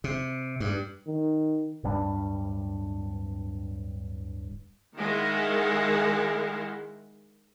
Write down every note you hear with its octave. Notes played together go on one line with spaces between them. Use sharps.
C3
G2
D#3
D1 G2 G3 D4
D#3 G#3 E4 A#4 F5 F#5